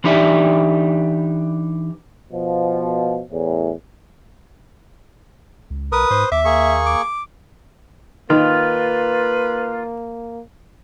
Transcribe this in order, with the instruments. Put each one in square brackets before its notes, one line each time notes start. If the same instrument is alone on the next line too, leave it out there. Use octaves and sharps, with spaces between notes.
[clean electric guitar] E3 D4 D#4 G4 D5 E5
[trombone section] B2 F3
E2 A2
[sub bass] C#2
[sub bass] B1 [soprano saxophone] A#4 [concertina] B4 D#6
[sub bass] G#2 [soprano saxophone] C5
[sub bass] D#2 [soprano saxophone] E5 [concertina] D6
[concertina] A#3 G#4 C#6
[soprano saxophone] D6
[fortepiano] D#3 [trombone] A#3 [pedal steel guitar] F4 [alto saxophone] B4